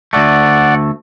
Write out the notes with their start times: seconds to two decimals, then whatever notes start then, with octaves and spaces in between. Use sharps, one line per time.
0.13 D2 A3 D5 F#5